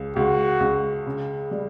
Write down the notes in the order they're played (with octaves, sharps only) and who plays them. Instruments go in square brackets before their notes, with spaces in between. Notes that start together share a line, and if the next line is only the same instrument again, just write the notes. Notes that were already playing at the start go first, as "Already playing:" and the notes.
Already playing: [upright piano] C#2
[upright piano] C#2 [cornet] F#4
[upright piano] C#2
C#3
G3